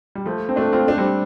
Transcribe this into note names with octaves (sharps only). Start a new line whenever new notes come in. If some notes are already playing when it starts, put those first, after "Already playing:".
G3
F3 A3
C4
A3 D4
C4 F4
A3 D4
G3 C4